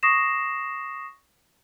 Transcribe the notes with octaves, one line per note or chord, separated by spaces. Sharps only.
C#6 D#6 A#6 C7 E7